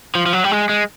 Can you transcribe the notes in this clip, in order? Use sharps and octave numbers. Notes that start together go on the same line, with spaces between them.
F3
F3
F#3
G3
G#3
G#3